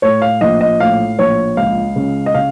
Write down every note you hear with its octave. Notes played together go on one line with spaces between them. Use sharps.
A2 C#5
F5
A#1 D#5
D#5
A2 F5
A#1 C#5
C#2 F5
C#3
D#5
C#3 F5